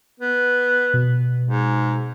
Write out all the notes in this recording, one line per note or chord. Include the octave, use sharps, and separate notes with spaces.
B3
B2
G#2